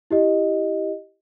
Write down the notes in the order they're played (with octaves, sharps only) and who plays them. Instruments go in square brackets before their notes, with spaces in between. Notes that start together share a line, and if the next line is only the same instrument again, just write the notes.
[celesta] E4 G4 D#5